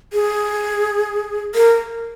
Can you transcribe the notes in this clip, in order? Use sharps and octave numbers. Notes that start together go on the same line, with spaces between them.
G#4
A#4